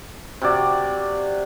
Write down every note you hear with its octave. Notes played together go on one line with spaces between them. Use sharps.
C3 F#4 D5 F#5